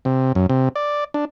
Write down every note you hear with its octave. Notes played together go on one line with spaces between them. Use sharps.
C3
F#2
C3
D5
D4